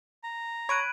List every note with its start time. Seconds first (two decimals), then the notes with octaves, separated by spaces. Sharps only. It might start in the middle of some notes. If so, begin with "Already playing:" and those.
0.24 A#5
0.69 C#5 B5 F#6 G#6 D7 D#7